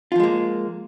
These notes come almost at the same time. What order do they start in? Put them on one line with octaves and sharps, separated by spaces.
F4 F3 G#3 A#3